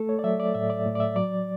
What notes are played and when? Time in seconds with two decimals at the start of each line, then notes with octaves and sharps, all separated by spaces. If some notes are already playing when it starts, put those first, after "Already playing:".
Already playing: A3 A4
0.09 C#5
0.19 D5
0.24 F#3 E5
0.40 D5
0.54 A2 E5
0.70 D5
0.85 A2
0.95 D5
1.00 E5
1.16 F#3 D5